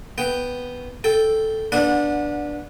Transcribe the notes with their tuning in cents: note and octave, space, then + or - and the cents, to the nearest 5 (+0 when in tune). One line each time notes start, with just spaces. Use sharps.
B3 +0 G5 +0
A4 +0 G5 +0
B3 -20 D4 +0 F#5 -30